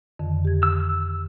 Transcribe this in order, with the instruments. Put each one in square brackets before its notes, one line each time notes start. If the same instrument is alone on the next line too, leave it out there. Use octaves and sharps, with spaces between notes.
[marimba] F2 D3 D#3
G4 G#6
[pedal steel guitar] E6